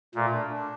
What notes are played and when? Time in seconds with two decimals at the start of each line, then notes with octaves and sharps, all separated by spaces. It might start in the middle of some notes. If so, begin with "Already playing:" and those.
0.15 A#2 A3
0.33 D4
0.50 D4